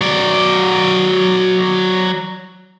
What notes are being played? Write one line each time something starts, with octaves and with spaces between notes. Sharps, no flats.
F#3 D5